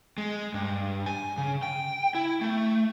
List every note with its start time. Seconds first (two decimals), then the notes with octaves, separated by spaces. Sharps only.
0.18 G#3
0.54 G2
1.06 G#5
1.38 C#3
1.63 G5
2.15 E4
2.41 A3